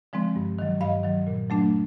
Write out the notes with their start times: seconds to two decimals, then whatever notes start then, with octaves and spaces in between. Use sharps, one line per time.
0.13 D3 F3 G#3 C4
0.36 G2
0.59 D#3 F#3
0.81 G2 D#5 F5
1.04 D#3 F#3
1.27 A#2
1.50 F#3 A3 D4